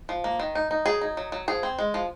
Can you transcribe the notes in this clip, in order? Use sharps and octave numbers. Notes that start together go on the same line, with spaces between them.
F3
A#3
D#3
D#4
D#4
F#3 G#4
D#4
F#3
F#3
F3 G#4
C4
G#3
F3